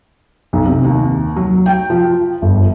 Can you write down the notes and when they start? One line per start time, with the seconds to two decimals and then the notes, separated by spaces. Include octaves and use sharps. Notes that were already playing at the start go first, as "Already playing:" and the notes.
0.53 B1
0.66 C3
0.84 D#2
1.36 F#3
1.66 G5
1.90 F3
2.42 G1